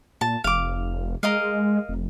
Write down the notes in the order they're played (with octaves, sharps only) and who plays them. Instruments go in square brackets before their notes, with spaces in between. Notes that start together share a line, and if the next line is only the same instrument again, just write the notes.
[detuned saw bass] A#2 [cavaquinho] A5
[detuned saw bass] F1 [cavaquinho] F5 D6
[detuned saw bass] G#3 [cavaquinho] A#4 D#5 F5
[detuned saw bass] F1